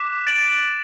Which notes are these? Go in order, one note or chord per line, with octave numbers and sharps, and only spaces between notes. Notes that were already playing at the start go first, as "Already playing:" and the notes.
Already playing: D6 F#6 B6 E7
A6 D7 F#7